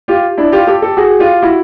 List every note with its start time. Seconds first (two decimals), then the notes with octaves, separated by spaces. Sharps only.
0.08 F4 G4
0.37 D4 E4
0.52 F4 G4
0.67 G4 A4
0.82 G4 A4
0.97 F#4 G#4
1.19 F4 G4
1.42 E4 F#4